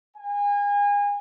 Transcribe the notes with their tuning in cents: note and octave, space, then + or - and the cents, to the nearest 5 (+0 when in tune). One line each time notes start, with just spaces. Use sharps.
G#5 -30